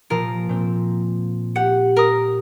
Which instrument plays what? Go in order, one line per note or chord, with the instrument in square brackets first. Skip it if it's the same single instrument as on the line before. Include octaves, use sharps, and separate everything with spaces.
[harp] A#2 F3 F4 [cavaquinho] A#4
[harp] A#2 C4
[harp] G4 [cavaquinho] F#5
[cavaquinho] A#4 D#6